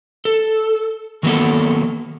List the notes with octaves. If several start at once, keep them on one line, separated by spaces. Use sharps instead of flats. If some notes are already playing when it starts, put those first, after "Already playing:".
A4
D#3 F#3 A#3 B3 A4